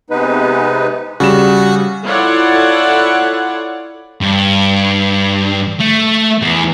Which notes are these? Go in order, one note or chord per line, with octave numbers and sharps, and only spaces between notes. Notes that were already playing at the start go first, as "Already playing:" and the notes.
C3 G#3 B3 D#4 B4
C#3 G3 F#4 E7
E4 F4 A4 C#5 D5 F#5
G2
A3
E2